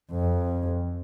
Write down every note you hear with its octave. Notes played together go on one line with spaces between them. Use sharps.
F2